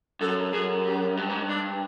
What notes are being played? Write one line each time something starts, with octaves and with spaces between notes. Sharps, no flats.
F#2 A4
F#2 G#4
G4
G2
G#2
G2
D4